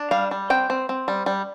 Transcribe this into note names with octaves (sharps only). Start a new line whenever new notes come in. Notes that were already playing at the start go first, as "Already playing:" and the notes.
Already playing: D4
G3 F5
G3
C4 G5
C4
C4
G3
G3